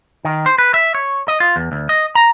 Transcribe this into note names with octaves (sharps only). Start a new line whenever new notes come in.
D#3
C5
B4
E5
C#5
D#5
F4
E2
D2
D#5
A#5